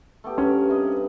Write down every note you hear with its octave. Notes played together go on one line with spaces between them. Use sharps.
A3 B3 G4
G2 C#4 A#4
C3 B4 D#5